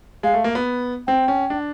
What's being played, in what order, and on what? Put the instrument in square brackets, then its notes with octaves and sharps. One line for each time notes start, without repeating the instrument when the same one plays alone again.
[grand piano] G#3 [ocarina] F5
[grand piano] A3
A#3
B3
[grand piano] C4 [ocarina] G5
[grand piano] C#4
D4